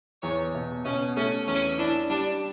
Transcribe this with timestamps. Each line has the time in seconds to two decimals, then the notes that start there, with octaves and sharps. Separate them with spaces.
0.23 E2 C#5
0.55 B2
0.85 B2 C#4
1.16 A3 C#4
1.47 E2 C#4
1.78 D4 E4
2.10 G3 D4